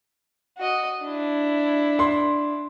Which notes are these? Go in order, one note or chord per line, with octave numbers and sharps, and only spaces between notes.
F#4 D#5
D4 E4
C6